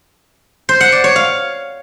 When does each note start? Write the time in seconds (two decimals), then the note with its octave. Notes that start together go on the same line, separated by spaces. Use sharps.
0.69 C5
0.81 F#5
0.92 D5
1.04 C#5
1.16 F5